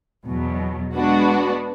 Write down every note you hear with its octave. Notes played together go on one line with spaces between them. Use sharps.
E2 B2 F#3
G#3 B3 D4 F#4 B4